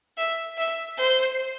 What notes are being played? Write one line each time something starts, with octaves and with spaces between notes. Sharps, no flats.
E5
E5
C5